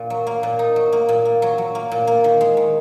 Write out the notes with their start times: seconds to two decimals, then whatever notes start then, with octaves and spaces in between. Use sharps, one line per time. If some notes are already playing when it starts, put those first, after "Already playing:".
Already playing: A#2 A#3
0.10 F#3
0.27 A#3
0.43 A#2
0.59 D#4
0.76 F#3
0.92 A#3
1.09 A#2
1.25 A#3
1.42 F#3
1.58 F#3
1.75 A#3
1.92 A#2
2.07 A#3
2.24 D#3
2.41 G#3
2.57 D#3